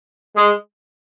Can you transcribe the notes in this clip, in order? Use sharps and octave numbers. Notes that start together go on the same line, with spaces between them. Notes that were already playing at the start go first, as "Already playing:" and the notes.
G#3